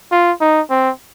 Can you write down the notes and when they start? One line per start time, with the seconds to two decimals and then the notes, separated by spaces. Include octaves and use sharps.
0.12 F4
0.41 D#4
0.70 C4